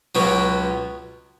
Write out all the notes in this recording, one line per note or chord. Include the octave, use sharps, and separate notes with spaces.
C#2 B2 F#3 C#4